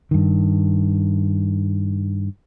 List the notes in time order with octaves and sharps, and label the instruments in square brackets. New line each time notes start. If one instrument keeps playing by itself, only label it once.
[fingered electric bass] G2 D#3